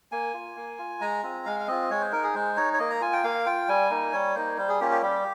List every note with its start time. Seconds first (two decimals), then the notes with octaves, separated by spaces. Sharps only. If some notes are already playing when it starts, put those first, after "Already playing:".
0.12 A#3 G#5
0.34 F4
0.56 A#3
0.78 F4
1.00 G#3 A#5
1.23 C4 F4
1.46 G#3 F5
1.60 F5
1.68 C4 F4 D#5
1.90 G#3 C#5
2.01 C5
2.12 D#4 A#4
2.23 G#4
2.34 G#3 C5
2.57 D#4 C#5
2.73 C#5
2.79 A#3 D#5
2.90 A#5
3.02 F4 G#5
3.13 G5
3.24 A#3 F5
3.46 F4 G5
3.69 G3 G#5
3.90 A#3 D#4
4.13 G3 C#5
4.35 A#3 D#4 C5
4.58 G3 C5
4.69 G#4
4.80 A#3 C#4 F4 G4
4.91 G4
5.02 G3 G4